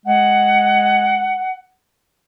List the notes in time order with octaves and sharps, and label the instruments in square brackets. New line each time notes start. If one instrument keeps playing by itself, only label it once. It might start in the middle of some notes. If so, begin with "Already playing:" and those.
[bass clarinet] G#3 [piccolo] F#5